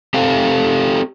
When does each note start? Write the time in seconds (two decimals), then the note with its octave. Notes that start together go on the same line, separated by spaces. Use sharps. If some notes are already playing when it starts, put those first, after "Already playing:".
0.14 C4 G4 A4 F5